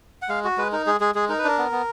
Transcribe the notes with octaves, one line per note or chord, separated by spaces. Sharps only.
F#5
G#3 F5
F#4
G#3 B4
D#4 A#4
G#3 G#4
G#3 G#4
G#3 G#4
D#4 A#4
B4
D4 A#4
B3
B3